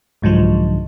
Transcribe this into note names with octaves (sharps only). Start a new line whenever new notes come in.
C2 G#2 D3 F3 F#3